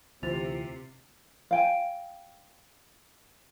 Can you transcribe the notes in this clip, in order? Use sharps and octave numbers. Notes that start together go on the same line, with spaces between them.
D2 C3 E3 F4 C5 A6 F7
F5 G5 G#5